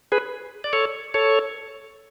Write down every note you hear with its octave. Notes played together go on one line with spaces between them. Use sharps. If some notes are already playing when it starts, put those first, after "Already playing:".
G#4 B4
D5
A4 C#5
A4 C#5